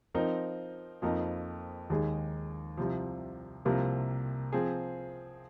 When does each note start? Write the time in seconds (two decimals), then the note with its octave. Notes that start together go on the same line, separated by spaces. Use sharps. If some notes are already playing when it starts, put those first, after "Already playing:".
0.15 F3 C4 D#4 A#4
1.02 F2 F3 A#3 D#4 A#4
1.90 D#2 D#3 G#3 D#4 G#4
2.77 C2 C3 F3
3.65 C2 C3 F3 A#3
4.53 F3 C4 G#4